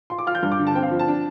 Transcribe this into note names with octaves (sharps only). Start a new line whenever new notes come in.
F4 C6
D6
F4 F6
G6
G2 F6
D6
D3
A5
C4 G5
F5
F3
A5
D4